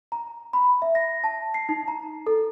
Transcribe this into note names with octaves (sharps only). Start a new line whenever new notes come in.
A#5
B5
E5
A#6
A5
C7
D#4
A#5
A4